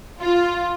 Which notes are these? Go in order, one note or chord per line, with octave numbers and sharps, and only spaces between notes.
F4